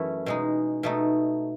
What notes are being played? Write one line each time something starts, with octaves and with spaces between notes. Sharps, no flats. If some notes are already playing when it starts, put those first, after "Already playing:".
Already playing: F#2 E3 A3 C#4 E4
B2 G#3 D#4
B2 A3 D#4